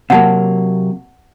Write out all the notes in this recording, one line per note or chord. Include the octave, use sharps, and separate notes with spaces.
C3 F#3 A#3 F#5 A5